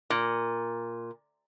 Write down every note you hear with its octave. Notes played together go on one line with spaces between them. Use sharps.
A#2